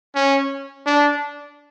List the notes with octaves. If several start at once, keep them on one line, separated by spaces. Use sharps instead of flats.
C#4
D4